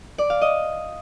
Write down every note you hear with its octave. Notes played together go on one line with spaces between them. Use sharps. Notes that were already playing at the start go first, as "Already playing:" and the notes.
D5
F5
D#5